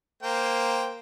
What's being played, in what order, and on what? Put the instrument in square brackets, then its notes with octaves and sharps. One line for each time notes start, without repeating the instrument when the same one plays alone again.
[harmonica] A#3 C5 G5